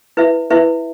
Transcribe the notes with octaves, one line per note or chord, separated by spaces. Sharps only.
E4 B4 E5
E4 B4 E5